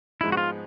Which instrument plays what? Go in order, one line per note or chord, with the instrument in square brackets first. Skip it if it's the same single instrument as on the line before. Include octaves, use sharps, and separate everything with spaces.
[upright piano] G#2 F3 G#3 B3 D#4 [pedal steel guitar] E4
[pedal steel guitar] F#4
F4